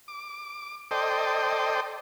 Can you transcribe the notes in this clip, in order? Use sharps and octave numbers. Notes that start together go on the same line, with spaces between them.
D6
A4 C5 D5 D#5 G5